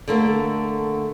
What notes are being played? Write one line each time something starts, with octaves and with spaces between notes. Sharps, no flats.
D3 A3 A#3